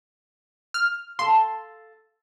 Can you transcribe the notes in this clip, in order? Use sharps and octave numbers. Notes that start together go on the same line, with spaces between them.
F6
A4 F5 C6